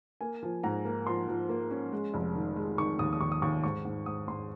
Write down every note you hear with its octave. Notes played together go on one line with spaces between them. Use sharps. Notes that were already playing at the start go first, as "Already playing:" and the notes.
A#3 G#5
F3
G#2 A#5
A#3
F3 C6
F3
A#3
C#4
G#3
F1
D#3
G#3
D#3 C#6
D#2 D#6
D#6
D#2 C#6
D#6
D#2 C#6
G#2 C#6
G#2
G#2 D#6
G#2 C6